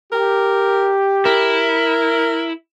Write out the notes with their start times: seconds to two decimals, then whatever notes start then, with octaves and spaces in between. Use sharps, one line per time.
0.13 G4 A#4
1.25 E4 A#4